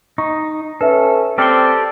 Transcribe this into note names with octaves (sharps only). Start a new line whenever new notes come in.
D#4 C#6
C#4 A4 B4 E5
C4 G4 A4 D5 F6 C#7 G7